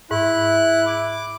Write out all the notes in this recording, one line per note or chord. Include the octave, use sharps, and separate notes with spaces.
G#2 E4 F#6
D6